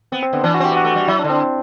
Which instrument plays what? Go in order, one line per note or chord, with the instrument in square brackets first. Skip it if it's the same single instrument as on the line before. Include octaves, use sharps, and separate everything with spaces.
[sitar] B3 [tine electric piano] C4
[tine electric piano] C4
[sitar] D3 [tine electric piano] B3
[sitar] E3 [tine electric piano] D4
[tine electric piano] F#4
[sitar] C4
[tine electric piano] G4
[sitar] B3 [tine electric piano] F#4
[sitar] A3
G3
[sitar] F#3 [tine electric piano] E4
[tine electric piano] D4
[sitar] D3
[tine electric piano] C4